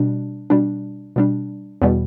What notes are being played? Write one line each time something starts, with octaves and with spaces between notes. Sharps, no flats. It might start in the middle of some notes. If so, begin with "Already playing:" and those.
Already playing: B2 G3 D4
B2 G3 D4
B2 G3 D4
E2 B2 G3